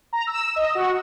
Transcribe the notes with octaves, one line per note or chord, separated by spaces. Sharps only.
A#5
E6
D#5
F#4